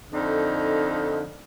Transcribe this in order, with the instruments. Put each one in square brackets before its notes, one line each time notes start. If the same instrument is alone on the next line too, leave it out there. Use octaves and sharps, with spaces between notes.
[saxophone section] F2 D3 D#4